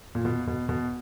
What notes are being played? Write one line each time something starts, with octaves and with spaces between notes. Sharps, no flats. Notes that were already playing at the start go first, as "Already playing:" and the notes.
A#2
B2
B2
B2